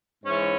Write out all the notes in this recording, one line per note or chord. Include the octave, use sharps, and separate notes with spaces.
G#2 E3 C#4